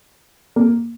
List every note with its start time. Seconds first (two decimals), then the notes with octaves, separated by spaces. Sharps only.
0.56 A#3